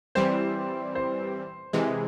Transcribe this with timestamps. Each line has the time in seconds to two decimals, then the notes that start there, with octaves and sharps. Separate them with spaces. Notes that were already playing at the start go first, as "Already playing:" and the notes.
0.15 E3 G3 C4 C5
0.95 C5
1.73 C3 E3 G#3